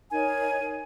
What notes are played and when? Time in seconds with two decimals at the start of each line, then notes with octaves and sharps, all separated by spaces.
0.11 D#4 A#4 C#5 G#5